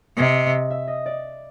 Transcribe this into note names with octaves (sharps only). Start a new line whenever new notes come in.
C3 D#5
E5
D#5
D5